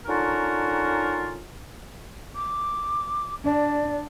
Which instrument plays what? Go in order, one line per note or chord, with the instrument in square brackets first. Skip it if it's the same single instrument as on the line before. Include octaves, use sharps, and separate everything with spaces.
[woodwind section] D3 C#4 D#4 F4 F#4 A#4
[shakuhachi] D6
[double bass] D4 [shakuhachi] D5